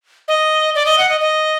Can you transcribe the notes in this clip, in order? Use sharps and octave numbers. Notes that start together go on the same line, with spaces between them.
D#5
D5
D#5
F#5
D#5
D#5